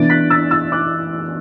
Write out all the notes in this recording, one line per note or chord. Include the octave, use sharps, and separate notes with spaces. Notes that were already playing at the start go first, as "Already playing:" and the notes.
Already playing: E3 B3 D4 A6 D7
F#6 B6
E6 A6
E6 A6
D6 F#6